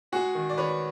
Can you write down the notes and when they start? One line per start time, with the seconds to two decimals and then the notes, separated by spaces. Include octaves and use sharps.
0.12 G#3 F#4 G#4
0.35 D#3
0.49 D5
0.57 D#3 B4 C#5